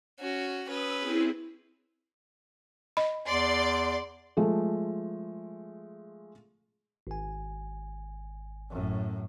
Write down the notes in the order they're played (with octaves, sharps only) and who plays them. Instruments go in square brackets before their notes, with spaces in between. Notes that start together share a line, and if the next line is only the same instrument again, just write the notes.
[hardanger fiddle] C#4 F#4
[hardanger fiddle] C#4 B4 [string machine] D#6 E6
[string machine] C4 E4 G#4
[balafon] D#5 B5
[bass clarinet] E2 [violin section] D5 C6
[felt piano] F3 G#3 A3
[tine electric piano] G#1 G#5
[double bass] F#2 A2